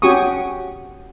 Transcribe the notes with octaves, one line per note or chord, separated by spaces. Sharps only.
C#4 F#4 G4 G#5 C#6 D#6